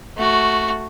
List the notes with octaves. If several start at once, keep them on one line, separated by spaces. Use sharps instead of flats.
A3 F#4